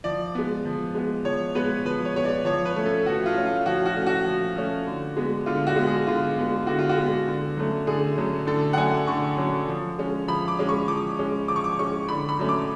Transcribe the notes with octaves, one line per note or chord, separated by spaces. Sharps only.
F3 D5
G#3 B3
F3
G#3 B3
F3 C#5
G#3 B3 B4
F3 B4
C#5
G#3 B3 C#5
D5
F3 C#5
B4
A3 C#4
A4
F3 F#4
F4
A3 C#4
F4
F3 F#4
F#4
A3 C#4
F#4
F3
A3 C#4
D3
G#3 B3
D3 F4
F#4
G#3 B3
G#4
D3 F4
G#3 B3
D3 F#4
F4
F#4
G#3 B3
D3
F#3 A3 C#4
D3 G#4
F#3 A3 C#4
D3 A4
F#5
F#3 A3 C#4 G#5
D3 C#6
F#3 A3 C#4
F3
G#3 C#4
F3 B5
D6
G#3 C#4
C#6
F3 D6
G#3 C#4
F3 D6
C#6
D6
G#3 C#4 C#6
D3 B5
B5
F#3 A3 C#4
D6